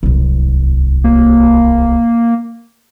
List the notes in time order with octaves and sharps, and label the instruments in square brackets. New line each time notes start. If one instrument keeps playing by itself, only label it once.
[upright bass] D1 C2
[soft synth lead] A#3